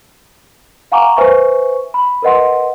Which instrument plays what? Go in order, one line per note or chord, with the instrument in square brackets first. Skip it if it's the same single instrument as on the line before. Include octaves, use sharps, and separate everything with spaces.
[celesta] F5 F#5 G#5 A#5 C#6 D6
B4 C5 E5 G#5 C#6
B5
A#4 B4 D#5 F#5 C6